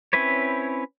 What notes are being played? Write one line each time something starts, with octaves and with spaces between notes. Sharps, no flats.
C4 C#4 E4 B4 C#5